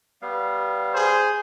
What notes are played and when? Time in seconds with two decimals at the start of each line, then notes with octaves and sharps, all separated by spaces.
0.22 G3 B3 F5
0.94 G#4 C5